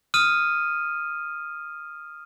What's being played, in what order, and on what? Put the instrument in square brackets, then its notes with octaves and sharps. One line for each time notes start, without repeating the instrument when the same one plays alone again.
[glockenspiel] D#6 F6 D#7